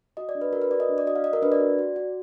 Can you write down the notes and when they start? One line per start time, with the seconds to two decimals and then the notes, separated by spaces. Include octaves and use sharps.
0.17 F#4 D#5
0.29 D5
0.35 D4
0.41 B4
0.53 F#4 A#4
0.62 B4
0.71 F#4 D5
0.80 D#5
0.89 D4
0.98 D5
1.07 F#4 D#5
1.15 F5
1.24 F#4 D#5
1.33 A#4
1.42 D4 B4
1.52 D5
1.60 F#4
1.79 F#4
1.96 F#4